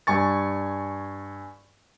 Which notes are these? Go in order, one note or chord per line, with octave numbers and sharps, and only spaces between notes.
G2 G#5 C#6 A6